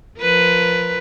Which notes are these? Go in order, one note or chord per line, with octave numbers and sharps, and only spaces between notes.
F3 A#4 B4